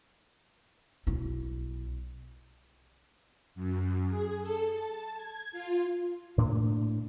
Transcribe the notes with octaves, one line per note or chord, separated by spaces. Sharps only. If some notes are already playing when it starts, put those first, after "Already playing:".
B1 E4
F#2
G#4
A4
A5
G#6
F4
A2 A#3 D4